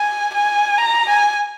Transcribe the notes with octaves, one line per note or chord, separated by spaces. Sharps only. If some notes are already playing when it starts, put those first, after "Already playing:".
Already playing: G#5
G#5
A#5
G#5